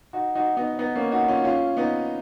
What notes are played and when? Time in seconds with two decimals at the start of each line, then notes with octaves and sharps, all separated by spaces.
0.13 D#4 F#4
0.35 D#4 F#4
0.57 B3 D#4
0.79 B3 D#4
0.95 A#3 C#4
1.11 D#4 F#4
1.28 C#4 F4
1.44 C#4 F4
1.77 B3 D#4